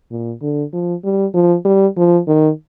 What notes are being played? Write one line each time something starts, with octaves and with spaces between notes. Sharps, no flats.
A#2
D3
F3
G3
F3
G3
F3
D#3